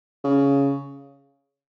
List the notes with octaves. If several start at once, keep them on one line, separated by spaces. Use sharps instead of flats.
C#3